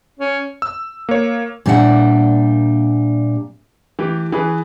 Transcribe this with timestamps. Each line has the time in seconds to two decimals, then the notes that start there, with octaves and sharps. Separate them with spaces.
0.19 C#4
0.62 E6
1.09 A#3 C#5
1.66 A#2 G3 A#3 D4 E5 F#5
3.99 E3 A3 G4
4.32 E3 G#4 B4